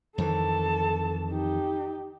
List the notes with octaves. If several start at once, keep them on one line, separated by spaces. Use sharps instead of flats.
F2 D#3 E3 A4 A5
D#4 G4